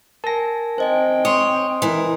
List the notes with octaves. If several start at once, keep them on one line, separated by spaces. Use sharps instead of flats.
A#4 G#5 A5 A#6
C4 C5 D#5 G5 G#5
C#5 C6 D#6
E3 A#4